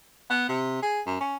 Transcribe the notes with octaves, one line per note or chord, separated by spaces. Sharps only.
B3
C3
G#4
F#2
C#4